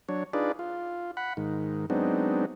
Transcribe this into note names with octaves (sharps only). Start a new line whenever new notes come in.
F#3 D4 C#5
D4 D#4 F4 G#4 B4 D5
F4
F#5 B5
G#2 D#3
F#3 G#3 B3 C4 D4 D#4